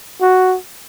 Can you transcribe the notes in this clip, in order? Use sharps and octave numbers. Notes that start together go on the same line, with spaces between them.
F#4